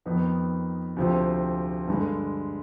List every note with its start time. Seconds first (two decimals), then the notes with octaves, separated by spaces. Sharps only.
0.06 F2 D#3 B3 D#4 B4
0.97 D2 C3 F3 C4
1.87 G2 D3 G#3